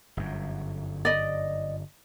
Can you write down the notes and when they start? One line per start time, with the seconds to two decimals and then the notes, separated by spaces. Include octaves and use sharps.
0.17 G1 F#2
1.05 D5 D#5